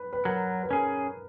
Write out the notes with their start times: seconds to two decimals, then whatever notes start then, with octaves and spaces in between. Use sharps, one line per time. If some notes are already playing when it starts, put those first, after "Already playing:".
Already playing: B4
0.13 B4
0.25 F#3 A#4
0.63 B4
0.70 C#4 G#4 A#4